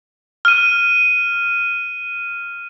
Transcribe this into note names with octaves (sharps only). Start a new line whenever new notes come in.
F6 D#7